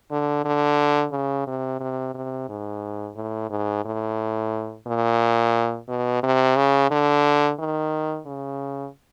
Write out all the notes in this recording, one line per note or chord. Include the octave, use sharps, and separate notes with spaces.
D3
D3
C#3
C3
C3
C3
G#2
A2
G#2
A2
A#2
B2
C3
C#3
D3
D#3
C#3